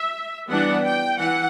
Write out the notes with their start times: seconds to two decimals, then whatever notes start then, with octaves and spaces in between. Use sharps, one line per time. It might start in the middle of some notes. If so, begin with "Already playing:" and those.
Already playing: E5
0.50 E3 G3 B3 D4 F#5
0.84 G5
1.19 E3 F#5